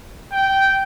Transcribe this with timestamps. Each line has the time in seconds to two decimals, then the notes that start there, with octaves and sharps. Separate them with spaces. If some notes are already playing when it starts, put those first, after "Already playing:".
0.33 G5